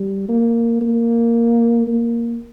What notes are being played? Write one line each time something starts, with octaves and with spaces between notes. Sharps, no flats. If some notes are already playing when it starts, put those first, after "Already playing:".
Already playing: G3
A#3
A#3
A#3